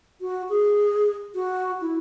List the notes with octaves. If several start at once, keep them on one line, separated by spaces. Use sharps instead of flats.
F#4
G#4
F#4
E4